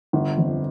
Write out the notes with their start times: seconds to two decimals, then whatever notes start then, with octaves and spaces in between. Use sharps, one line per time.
0.13 G1
0.38 F2